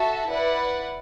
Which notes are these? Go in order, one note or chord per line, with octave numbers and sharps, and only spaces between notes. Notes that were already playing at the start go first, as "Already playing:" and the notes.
Already playing: F#4 A4 E5 A5
E4 B4 D5 F#5